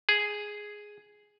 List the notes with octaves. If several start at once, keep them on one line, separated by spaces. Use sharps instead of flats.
G#4